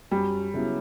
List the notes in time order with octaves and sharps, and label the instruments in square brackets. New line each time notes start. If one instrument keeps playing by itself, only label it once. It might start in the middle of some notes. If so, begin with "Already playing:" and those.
[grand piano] F#2 [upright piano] G3
[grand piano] C#3 F#3 B3 E4